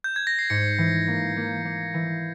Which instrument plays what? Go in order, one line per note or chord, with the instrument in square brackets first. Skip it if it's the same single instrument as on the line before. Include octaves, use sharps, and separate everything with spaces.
[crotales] G6
G#6
A#6
C7
[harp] G#2 [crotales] C#7
[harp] E3
A#3
A#3
A#3
E3